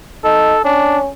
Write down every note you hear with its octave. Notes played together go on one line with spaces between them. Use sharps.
D#4 A4
C#4 D4